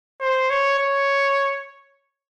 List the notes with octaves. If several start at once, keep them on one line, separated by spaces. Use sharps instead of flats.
C5
C#5
C#5